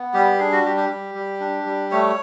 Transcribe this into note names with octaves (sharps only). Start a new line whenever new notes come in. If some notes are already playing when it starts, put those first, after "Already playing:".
Already playing: B3
G3 G4
D4 G#4
F#4
G3 G4
G4
G3
G3
D4
G3
A3 C#5